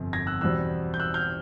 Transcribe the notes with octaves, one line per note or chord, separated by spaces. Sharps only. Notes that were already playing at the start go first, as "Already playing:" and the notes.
Already playing: G1 F2 C3
G#6 A#6
E6 F#6
E2 B2 G3 C4 E6 F#6
G6
E6 F#6
F6 G6